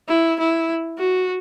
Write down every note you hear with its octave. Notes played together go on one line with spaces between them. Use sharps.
E4
E4
F#4